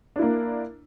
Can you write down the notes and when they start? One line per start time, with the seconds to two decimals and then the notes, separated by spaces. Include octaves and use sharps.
0.16 D4
0.19 E4
0.22 A#3